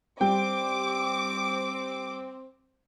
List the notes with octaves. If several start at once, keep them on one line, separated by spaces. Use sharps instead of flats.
G3 C4 G5 D6